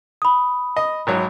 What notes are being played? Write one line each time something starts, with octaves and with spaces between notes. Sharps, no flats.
B5 D#6
D#5
G#1 F#3